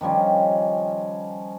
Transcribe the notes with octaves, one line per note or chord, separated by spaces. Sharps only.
D#3 F3 G3 C#4